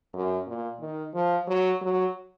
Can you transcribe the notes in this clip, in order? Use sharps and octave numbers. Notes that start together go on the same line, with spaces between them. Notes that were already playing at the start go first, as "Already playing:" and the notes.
F#2
A#2
D#3
F3
F#3
F#3